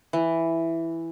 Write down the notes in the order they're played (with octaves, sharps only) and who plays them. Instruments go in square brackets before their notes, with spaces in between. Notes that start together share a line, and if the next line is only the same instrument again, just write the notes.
[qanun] E3